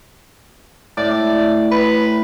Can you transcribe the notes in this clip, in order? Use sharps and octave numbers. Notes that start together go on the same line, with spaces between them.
A2 D5
B4